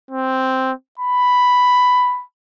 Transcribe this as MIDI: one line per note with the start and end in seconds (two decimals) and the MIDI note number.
0.11 0.72 60
0.99 2.23 83